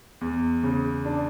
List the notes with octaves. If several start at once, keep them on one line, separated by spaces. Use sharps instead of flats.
E2
C#3
D4